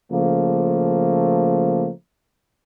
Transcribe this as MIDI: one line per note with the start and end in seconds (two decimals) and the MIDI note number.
0.11 1.88 49
0.11 1.88 53
0.11 1.88 57
0.11 1.88 58